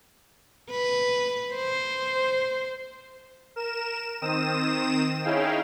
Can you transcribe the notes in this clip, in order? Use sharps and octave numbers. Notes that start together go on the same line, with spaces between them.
B4
C5
A#4 E7
D#3 C4 D#6 E7
C#4 D#4 E4 G#4 F5 G5